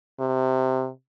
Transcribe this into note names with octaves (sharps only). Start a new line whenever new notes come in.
C3